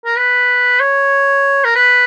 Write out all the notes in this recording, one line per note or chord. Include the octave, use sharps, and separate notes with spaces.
A#4
B4
C#5
A#4
B4